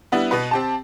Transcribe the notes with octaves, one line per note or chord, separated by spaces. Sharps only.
G3 B3 D4 E4
B2 B3 B4
C4 G4 A5